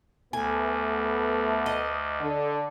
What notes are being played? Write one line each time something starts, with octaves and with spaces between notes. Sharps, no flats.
D2 A3 B3 G#5
D#5
D3